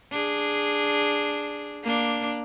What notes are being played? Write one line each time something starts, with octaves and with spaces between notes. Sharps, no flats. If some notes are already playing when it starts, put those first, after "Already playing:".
D4 G#4
A#3 D4